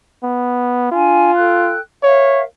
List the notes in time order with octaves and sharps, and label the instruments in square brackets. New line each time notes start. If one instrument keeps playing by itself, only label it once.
[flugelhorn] B3
[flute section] D4 G5 G#5 [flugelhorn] F4
[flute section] A4 G5 F#6
[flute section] A#4 E5 F5 [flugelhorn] C#5